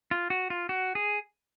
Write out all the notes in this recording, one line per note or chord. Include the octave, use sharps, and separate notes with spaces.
F4
F#4
F4
F#4
G#4